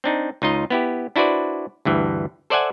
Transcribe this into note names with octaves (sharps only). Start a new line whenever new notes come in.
C4 D4 D#4
C#2 D#4 F4 D#5
B3 E4 G4
D4 E4 F#4 B4 C5 D5
D2 G2 E3
A4 C5 D5 E5 F#5 G#5